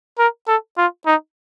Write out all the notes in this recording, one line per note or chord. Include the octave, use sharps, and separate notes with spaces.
A#4
A4
F4
D#4